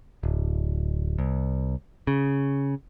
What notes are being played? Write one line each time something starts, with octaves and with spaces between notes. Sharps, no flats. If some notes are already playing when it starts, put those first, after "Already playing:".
D1
C2
C#3